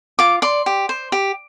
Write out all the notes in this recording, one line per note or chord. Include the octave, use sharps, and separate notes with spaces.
F4 D6
D5 C6
G4
C5
G4